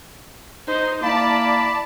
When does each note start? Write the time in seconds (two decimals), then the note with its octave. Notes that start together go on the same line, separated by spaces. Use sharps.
0.67 D#4 C5
1.03 A#3 E4 D5 A5 B5 D6